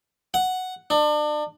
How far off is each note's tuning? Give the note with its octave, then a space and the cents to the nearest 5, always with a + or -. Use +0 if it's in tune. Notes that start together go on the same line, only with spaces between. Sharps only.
F#5 +0
D4 +35